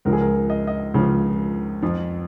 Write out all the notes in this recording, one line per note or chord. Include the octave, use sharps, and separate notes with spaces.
C#2 C#3 F3 A#4
G#4
A#4
D#5
D#5
C#2 C#3 F3
F2 F3